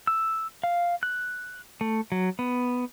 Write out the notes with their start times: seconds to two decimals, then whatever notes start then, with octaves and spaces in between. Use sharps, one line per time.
0.07 E6
0.64 F5
1.03 F#6
1.81 A3
2.12 F#3
2.39 B3